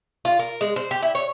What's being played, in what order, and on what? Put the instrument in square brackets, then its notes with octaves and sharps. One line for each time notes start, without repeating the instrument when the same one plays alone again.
[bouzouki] F4
A#4
G#3
C5
G4
E4
C#5